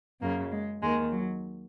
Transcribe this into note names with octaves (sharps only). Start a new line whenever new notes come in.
F#2 C#3 A#3
G#3
D#2 D#3 G#3
F#3